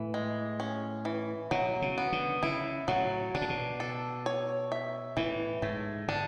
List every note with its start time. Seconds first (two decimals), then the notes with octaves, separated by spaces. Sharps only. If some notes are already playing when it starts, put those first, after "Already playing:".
Already playing: A2 E3
0.14 G#3
0.60 C#4
1.05 E3
1.51 B2 F#3
1.82 C#3
1.98 B3
2.12 D3
2.43 C#3 E4
2.88 A2 F#3
3.35 B2 D4
3.42 A2
3.50 B2
3.80 A4
4.26 C#5
4.72 E5
5.17 A2 E3
5.62 G#2 A3
6.08 D3 D4